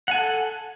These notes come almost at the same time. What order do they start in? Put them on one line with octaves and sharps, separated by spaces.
F#5 G#5 A4